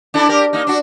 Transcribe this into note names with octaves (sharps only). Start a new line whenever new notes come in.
D4 E4 A4
G4 A#4
A#3 D#4
D4 F#4